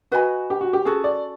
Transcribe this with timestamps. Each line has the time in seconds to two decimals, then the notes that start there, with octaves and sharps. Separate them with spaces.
0.12 F#4 B4 D#5 G#5 B5
0.50 G4
0.61 F#4
0.73 G4
0.85 C#4 F#4 G#4 A4
1.04 D5